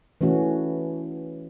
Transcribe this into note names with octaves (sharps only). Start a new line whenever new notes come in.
E3 A3 C#4 F#4